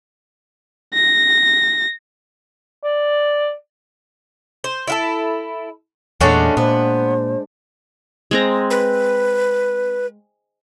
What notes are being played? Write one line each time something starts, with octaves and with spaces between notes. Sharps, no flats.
A#6
D5
C5
E4 F4 A4
E2 A#2 G#3 A3 C#4 D4 F#4
A#2 B3 C5
G#3 C4 A#5
B4